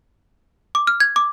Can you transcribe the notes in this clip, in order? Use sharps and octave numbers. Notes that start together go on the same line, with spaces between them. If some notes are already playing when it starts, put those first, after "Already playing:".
D6
F6
G#6
D6